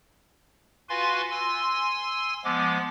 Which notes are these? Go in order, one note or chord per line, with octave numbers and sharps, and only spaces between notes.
F4 F#4 B4 F5 G#5 C6
G#5 C6 E6
F3 G#3 B3 D6